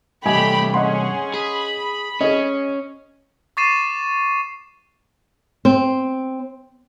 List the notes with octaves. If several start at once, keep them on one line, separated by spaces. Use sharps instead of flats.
C2 G2 A3 G4 D#5 G#5 B5
C#4 G#4 D#5 F#5 C6
G#4 B5
C#4 G#4 D#5
C#6 D6 A6 C7 D#7 E7
C4